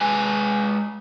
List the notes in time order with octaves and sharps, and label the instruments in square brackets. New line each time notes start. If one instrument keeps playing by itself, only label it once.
[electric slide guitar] G#3 B4 G#5